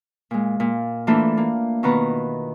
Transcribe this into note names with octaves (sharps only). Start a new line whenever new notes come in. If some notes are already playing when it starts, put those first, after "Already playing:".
A#2 G#3
A#2
E3 A3 A#3 D4 F4 A4
A#3
B2 D#3 B3 B4 A#5